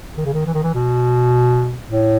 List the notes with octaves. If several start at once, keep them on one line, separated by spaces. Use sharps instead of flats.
D#3
C#3
D#3
E3
D#3
E3
B2
A2